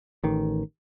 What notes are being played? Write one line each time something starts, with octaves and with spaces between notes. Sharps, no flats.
A1 D#3